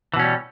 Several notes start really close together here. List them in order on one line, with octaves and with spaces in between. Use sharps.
E3 B2 C#4 G3